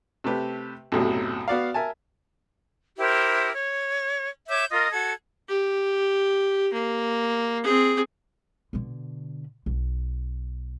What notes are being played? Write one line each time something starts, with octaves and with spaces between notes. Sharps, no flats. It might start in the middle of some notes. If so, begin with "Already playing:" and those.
C3 A3 G4 B4
B1 F#2 A2 C3 F#3
B3 F#4 D5 F5
A#4 E5 G#5 A5
E4 G4 A#4 C5
C#5
C#5 E5 D6 G6
F4 A#4 D#5
F#4 A4 G#6
G4
A#3
C4 G#4
B2 D3
B1